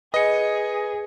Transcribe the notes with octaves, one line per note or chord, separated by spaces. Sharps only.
G#4 B4 D#5 C#7